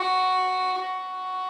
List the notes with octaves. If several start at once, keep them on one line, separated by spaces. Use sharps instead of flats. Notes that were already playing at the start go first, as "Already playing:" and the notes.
Already playing: F#4
F#4